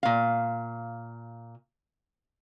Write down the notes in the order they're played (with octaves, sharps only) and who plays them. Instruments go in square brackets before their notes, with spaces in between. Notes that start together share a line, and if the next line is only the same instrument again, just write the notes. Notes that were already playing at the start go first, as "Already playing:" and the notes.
[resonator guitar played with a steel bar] A#2 F5